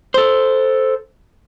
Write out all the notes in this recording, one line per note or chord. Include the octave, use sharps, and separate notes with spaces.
A4 C5